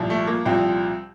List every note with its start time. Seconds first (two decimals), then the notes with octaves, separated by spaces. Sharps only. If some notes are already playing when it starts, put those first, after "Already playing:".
Already playing: C2 A#2 F3
0.10 A3
0.27 A#3
0.45 C2 A#2 F3 C4